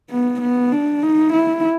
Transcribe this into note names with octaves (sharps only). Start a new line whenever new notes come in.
B3
B3
D4
D#4
E4